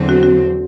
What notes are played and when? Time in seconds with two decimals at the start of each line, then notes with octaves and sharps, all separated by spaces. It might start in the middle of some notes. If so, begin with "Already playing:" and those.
Already playing: E2 D3 F#3 C4
0.09 F#4
0.23 F#4